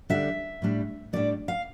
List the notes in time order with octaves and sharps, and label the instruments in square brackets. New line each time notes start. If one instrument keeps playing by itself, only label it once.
[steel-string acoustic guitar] D3 G3 D4 E5
A2 G3 D4
A2 G3 D4 D5
F5